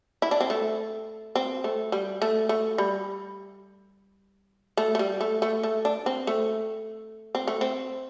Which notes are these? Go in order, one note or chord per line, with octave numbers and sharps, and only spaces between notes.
E4
D4
C4
A3
C4
A3
G3
A3
A3
G3
A3
A3
G3
A3
A3
A3
D4
C4
A3
C4
A3
C4